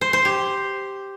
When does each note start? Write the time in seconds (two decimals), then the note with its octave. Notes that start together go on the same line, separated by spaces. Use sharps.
0.01 C5
0.13 C5
0.25 G4